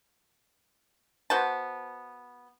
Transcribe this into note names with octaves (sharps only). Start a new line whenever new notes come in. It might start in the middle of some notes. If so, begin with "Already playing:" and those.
B3 F#4 C5 A5